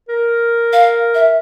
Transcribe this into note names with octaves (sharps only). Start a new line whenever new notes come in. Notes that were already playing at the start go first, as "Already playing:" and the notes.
A#4
F5
E5